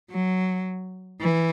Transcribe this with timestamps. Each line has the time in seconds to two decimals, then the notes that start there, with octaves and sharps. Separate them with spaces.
0.11 F#3
1.21 E3